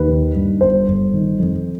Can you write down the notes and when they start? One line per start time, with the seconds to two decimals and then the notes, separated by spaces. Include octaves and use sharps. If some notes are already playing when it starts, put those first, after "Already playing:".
Already playing: D#2 B4
0.09 D#3
0.35 G2
0.61 G1 C5
0.88 G1
1.13 D#3
1.39 F2